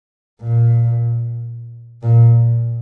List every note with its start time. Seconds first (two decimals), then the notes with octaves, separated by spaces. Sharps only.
0.41 A#2
2.03 A#2